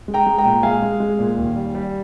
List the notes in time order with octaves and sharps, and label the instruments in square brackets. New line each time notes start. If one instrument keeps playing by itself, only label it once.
[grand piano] G#3
G5 A#5
G#3
G5 A#5
A#2
G#3 F5 G#5
G#3
G#3
A#2
D#2
G3
G3